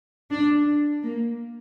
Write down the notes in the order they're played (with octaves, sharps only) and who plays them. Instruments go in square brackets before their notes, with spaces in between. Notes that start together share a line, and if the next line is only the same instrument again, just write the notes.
[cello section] D4
A#3